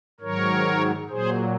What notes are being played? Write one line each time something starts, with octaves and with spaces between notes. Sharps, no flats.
G#2 D#3 F#3 A#4 C#5
A#2 F#3 G#4 C5